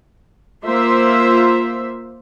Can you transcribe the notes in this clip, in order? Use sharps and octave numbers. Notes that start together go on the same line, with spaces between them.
A#3 F4 C5 E5